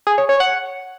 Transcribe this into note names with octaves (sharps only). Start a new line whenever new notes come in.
G#4
C#5
C#5
F#5